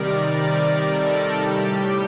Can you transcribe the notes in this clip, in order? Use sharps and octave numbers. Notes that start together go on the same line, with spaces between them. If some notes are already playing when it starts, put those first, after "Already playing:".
Already playing: C3 D#3 G3 A#4 D5
D5
A4
A2 G3 G4